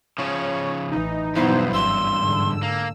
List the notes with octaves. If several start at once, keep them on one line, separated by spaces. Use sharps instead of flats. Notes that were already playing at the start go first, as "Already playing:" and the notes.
C#3 F3 C#5
A1 E3 D#4
E2 G2 B2 F#3 B3 D#4 E4 C5
G#1 C6 E6
G#2 D3
A#3